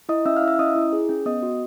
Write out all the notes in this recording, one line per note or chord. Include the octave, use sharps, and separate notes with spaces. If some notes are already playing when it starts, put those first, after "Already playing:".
E4 D#5 D#6
C#4 E5 E6
F5 F6
E4
E5 E6
C#4 D#5 D#6
E4
G#4
C#4
B3 D#5 D#6
F#4